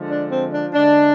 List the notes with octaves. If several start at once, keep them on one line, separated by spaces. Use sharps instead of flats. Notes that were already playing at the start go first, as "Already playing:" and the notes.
Already playing: D3 F3 G#3
D4
C4
D4
D3 G#3 D4